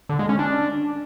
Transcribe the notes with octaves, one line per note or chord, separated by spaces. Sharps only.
D3
G#3
C#4
D4